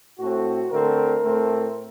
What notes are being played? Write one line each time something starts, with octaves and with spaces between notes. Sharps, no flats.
A2 A3 C4 F#4
D3 A3 C4 A#4
A2 A3 C4